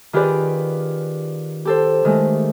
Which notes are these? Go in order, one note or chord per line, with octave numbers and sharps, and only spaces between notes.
D#3 F4 G4 G#4 B4 D5
G4 A4 C5
D#3 G#3 A3